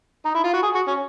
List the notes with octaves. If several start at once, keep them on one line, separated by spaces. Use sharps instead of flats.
D#4
E4
F4
F#4
G#4
F#4
C#4